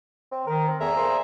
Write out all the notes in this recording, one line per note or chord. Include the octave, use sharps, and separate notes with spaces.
C4
D#3 A#4
C4
E2 A3 G#4 E5 A#5
A#2 C5